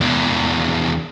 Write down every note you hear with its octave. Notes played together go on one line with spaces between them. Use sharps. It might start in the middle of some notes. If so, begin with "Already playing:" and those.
E2 D4